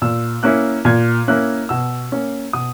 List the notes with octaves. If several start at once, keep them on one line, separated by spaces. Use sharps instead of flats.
A#2 E6
A#3 C#4 E4 F#6
A#2 G#6
A#3 C#4 E4 F#6
B2 E6
A#3 C#4
B2 D#6